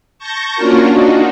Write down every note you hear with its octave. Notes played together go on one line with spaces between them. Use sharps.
A5 C#6 G6 A#6
A#3 C#4 D4 F4 F#4 A#4
D4 D#4 F#4